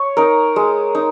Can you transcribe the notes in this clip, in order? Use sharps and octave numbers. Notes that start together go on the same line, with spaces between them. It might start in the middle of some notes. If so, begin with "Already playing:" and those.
Already playing: C#5
D#4 A#4
G#3
D#4